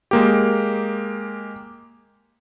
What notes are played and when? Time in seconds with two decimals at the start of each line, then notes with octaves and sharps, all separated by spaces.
0.11 G#3 A#3 G4